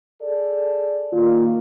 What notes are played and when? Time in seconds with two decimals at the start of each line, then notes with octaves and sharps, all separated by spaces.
0.21 G#4 A4 D5
1.13 D#3 A#3 F4